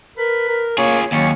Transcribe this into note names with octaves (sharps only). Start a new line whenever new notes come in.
A#4 B4
A#4
A#3 F4 G#4 C#5
D#2 F#3 C#4